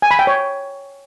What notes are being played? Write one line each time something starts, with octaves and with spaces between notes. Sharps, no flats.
G#5
B5
G5
C#5